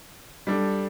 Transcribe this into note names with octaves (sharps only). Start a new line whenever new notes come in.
G3 D4 A4